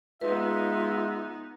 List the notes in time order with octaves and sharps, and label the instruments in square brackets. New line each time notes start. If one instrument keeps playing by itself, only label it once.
[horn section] G#3 E5 [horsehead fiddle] B3 D#4 [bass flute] F4 [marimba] B4